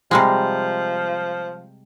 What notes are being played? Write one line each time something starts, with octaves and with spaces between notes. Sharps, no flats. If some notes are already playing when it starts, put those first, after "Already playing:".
C3 F3 G3 G#3